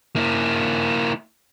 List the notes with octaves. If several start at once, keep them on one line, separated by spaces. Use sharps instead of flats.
A#3 E4